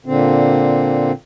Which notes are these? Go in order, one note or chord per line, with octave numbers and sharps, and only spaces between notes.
A#2 D3 C4